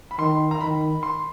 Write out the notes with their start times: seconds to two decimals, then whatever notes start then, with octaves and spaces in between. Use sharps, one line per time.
0.11 B5
0.18 D#3 C6
0.51 A#5
0.61 D#3 B5
1.03 C6